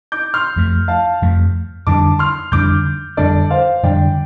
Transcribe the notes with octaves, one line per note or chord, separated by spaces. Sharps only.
D6 G6
C6 F6
F2 F3 A3
F5 A5
F2 F3 A3
F2 D3 G3 D4 A5 D6
C6 F6
F2 D3 G3 D4 D6 G6
F2 D3 G3 D4 A4 D5
C5 F5
F2 D3 G3 D4 D5 G5